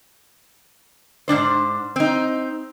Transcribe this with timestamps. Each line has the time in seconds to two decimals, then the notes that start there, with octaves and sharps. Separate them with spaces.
1.28 G#2 C#3 D4 C5
1.96 C4 D#4